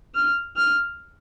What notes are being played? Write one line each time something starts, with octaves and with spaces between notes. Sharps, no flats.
F6
F6